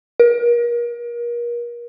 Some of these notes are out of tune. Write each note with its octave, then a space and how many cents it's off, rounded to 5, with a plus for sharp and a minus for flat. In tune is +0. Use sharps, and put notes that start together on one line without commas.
A#4 +35